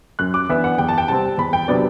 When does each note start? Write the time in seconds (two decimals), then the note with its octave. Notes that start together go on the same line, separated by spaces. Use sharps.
0.19 F#2 F#6
0.34 D6
0.49 E3 B3 D4 E5
0.64 F#5
0.78 E2 G5
0.88 A5
0.98 G5
1.08 C3 G3 C4 A5
1.38 E2 B5
1.53 G5
1.68 C3 F#3 B3 D4 D5